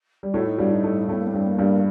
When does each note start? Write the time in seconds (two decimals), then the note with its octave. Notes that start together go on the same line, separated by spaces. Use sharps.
0.23 G3
0.33 A2 A3 F#4
0.45 D#4
0.57 G2 G3 F#4
0.71 D#4
0.84 A2 A3
1.08 A2 A3 C4
1.18 A#3
1.26 C4
1.33 G2 G3
1.46 A#3
1.58 G2 G3